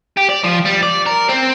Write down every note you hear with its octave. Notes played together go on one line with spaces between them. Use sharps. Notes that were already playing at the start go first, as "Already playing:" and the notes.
G4
D5
F3
G3
D5
A#4
C4